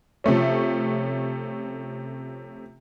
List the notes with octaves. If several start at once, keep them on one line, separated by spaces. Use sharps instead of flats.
C3 F3 A3 C#4